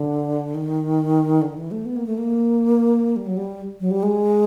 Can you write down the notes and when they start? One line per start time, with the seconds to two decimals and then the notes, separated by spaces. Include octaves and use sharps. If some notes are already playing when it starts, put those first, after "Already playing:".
Already playing: D3
0.55 D#3
1.42 D3
1.57 E3
1.71 A3
1.85 B3
1.96 A#3
2.07 A3
2.18 A#3
3.16 G3
3.27 F#3
3.37 G3
3.80 F#3
3.91 G3
4.03 G#3